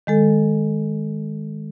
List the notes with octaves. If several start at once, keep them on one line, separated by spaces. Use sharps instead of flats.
D#3 G#3 A4